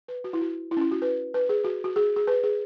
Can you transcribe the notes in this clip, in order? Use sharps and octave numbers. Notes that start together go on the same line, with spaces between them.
B4
F#4
E4
F#4
E4
C#4
E4
F#4
B4
B4
G#4
F#4
F#4
G#4
G#4
B4
G#4